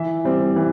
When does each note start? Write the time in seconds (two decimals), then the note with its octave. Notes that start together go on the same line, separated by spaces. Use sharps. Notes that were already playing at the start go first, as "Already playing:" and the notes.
Already playing: E3 E5
0.25 G3 C4
0.56 E3